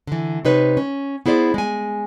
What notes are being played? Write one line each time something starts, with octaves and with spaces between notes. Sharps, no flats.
D3 E3
C3 D#4 B4 C#5
C#4
B3 E4 G#4 C5 D5
G#3 G#5